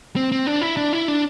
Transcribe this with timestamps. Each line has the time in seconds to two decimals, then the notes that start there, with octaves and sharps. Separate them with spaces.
0.16 C4
0.32 C4
0.47 D4
0.61 E4
0.77 D4
0.93 E4
1.08 D4